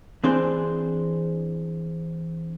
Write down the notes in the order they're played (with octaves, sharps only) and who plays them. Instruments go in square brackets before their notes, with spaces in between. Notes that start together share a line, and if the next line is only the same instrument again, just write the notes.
[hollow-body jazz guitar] E3 C4 D4 G#4 C5